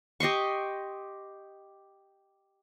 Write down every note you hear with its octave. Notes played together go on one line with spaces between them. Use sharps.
G4 D#5 C6 C#6